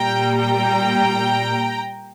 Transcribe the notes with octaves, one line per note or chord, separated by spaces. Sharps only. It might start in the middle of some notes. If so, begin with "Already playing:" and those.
Already playing: A#2 G3 G5 A#5
G5 A#5